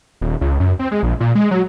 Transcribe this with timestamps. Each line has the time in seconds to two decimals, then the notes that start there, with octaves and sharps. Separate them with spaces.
0.21 D#1
0.41 C#2
0.60 F#2
0.79 C4
0.91 G#3
1.03 A#1
1.20 A#2
1.35 G#3
1.51 F#3